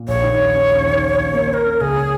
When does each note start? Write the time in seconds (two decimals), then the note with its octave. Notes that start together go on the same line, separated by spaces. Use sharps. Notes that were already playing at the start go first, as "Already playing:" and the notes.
Already playing: A#2
0.08 A#1 C#5
0.23 D#3
0.40 D#2
0.55 C#4
0.70 D#2
0.86 D#3
1.02 C#4
1.17 D#2
1.33 A#3
1.49 C#4 A#4 C#5
1.64 C#4
1.81 C#2 G#4
1.95 C#4